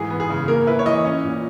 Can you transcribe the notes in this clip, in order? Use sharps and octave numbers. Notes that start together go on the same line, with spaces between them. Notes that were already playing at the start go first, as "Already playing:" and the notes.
Already playing: G#2 E3 G#4
B3
G#4
C#3
A#3 A#4
E4 B4
C#5
E3 D#5
C#4
A#2